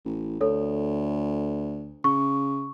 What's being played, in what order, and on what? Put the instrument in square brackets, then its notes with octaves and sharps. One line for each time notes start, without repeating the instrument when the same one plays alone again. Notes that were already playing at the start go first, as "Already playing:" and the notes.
[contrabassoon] A1
[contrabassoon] D2 [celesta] A4 C#5
[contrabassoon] C#3 [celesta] C#6